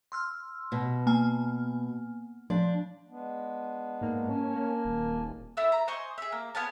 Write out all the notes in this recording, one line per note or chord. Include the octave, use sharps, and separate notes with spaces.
C6 E6 F6
B2
A#3 G#5 F6
F3 D4
G#3 B3 D4
G#2 A#3
C#4 G#5 A5
A#3
D#1
E4 A4 E5 E6
A#5
C5 D#5 G#5 C#6
G#4 E5
A#3
B3 F5 G#5 A5